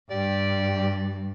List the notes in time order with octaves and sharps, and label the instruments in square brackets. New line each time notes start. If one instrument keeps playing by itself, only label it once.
[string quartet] G2 [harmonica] G4 D5